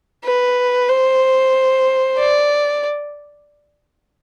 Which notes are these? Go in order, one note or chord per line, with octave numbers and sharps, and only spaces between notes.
B4
C5
D5